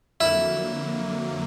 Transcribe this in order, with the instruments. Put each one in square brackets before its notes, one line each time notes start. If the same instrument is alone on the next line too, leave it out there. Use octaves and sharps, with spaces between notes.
[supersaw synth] F2 D3 F#3 A#3 [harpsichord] E4